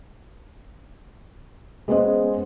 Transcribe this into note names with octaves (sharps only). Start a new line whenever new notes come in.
G#3 B3 C#4 G#4 C5 D#5